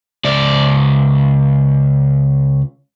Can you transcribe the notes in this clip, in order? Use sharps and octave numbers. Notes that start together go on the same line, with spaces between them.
C#2 D5